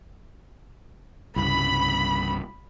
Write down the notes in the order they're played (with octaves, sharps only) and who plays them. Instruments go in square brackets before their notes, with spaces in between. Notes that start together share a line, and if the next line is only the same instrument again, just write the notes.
[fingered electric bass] C2 G2 C#3 [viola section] B5